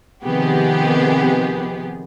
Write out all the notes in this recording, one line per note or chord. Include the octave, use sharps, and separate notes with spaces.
C3 D#3 F3 B3 G4 G#4